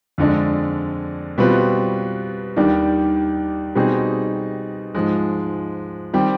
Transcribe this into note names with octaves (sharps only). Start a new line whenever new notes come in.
F2 D3 G#3 D4
B2 G3 C4 F4 B4
D#2 D#3 G3 D4 G4
B2 G3 C4 D#4 G#4
G#2 F3 G#3
D#3 G3 C4 G4